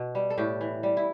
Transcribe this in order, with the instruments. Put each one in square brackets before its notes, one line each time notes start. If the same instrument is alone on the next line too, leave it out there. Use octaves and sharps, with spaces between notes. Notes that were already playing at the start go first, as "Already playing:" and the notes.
Already playing: [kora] B2
G3
A4
A2 G4
E3
G3
E4